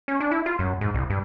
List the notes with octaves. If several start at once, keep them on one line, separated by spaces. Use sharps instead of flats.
C#4
D4
E4
F4
F#2
G#2
C2
G2